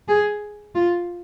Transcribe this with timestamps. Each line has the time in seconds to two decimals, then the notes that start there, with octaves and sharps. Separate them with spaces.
0.08 G#4
0.75 F4